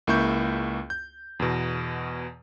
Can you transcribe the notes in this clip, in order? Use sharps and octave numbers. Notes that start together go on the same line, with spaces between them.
C#2 A#3 E4 C#6 G6
G6
E2 B2